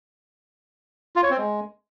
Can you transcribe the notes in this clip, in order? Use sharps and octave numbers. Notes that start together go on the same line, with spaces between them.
F4
C#5
C4
G#3